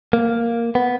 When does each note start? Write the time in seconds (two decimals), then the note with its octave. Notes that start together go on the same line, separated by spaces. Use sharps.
0.13 A#3
0.75 B3